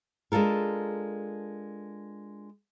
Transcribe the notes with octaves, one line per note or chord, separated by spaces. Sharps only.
G#3 D4 F4 A4 A#4